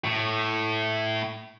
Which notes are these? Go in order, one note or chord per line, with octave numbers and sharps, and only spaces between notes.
A2